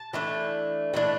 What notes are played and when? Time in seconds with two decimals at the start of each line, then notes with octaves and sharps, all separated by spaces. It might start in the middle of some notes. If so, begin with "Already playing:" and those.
Already playing: A5
0.13 E3 A3 D4
0.94 E3 A3 D4